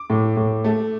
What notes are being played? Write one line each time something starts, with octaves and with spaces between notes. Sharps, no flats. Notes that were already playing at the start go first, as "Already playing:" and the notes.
Already playing: D6
A2
A2
A3